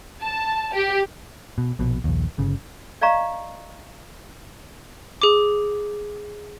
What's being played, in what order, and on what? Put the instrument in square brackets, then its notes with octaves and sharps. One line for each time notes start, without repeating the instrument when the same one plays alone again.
[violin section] A5
G4
[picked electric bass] B2
A#1 B2
A#1 D#2
G1 C#3
[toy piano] D5 D#5 F5 A#5 C#6
[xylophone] G#4 D6